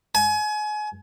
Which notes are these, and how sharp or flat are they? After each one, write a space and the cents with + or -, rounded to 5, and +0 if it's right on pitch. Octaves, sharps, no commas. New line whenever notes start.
G#5 +30